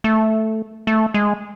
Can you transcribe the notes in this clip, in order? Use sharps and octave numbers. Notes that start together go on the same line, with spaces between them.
A3
A3
G#3